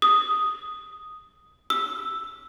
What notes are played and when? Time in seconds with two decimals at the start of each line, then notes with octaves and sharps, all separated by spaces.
0.02 D#6
1.70 E6